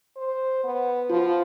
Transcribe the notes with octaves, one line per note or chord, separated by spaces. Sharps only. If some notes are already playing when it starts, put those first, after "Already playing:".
C5
B3
F3 F4